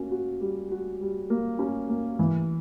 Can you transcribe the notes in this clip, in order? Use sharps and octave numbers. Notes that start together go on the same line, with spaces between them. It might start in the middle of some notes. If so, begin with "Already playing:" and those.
Already playing: A#3 C#4 F#4
F#4
G3
F#4
G3
A#3
C#4
A#3
E3